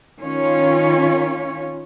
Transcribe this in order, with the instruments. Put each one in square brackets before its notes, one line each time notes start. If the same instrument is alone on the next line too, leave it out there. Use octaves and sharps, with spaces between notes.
[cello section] D#3 C#4 F4 C#5